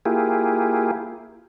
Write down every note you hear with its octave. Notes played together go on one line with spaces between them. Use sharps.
A#3 E4 F4 G4 G#4